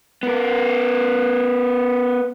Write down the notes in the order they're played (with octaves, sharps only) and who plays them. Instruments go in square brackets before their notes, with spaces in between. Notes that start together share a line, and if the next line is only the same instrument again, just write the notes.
[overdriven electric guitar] B3 A#4